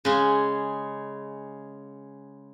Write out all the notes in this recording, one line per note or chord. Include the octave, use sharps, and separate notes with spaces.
C#3 G#3